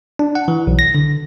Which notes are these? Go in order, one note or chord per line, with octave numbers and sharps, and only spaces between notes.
D4
F#5
E3
B1
A#6
D3